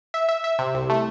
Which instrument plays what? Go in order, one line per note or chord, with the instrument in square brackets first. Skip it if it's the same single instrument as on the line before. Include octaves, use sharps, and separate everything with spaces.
[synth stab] E5
E5
E5
C3
C2
A3